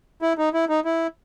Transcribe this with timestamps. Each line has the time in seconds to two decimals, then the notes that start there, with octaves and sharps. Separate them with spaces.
0.22 E4
0.38 D#4
0.54 E4
0.69 D#4
0.85 E4